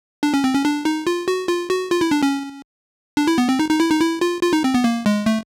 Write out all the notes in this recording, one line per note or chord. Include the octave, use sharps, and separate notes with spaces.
D4
C#4
C4
C#4
D4
D#4
F4
F#4
F4
F#4
F4
E4
D4
C#4
D4
E4
B3
C4
D#4
D#4
E4
D#4
E4
F4
F4
D#4
C4
B3
A#3
G#3
A3